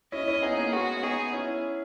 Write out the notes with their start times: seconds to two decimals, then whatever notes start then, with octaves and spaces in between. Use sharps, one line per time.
0.12 C#4 E4 D#5
0.28 C#4 E4
0.42 B3 D#4 G#4
0.57 A#3 C#4
0.72 G#3 B3 F#4
0.97 C#4
1.03 B3 D#4 G#4
1.33 C#4 E4